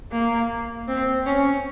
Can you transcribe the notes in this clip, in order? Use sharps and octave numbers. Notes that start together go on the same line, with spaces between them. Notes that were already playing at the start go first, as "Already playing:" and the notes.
A#3
C4
C#4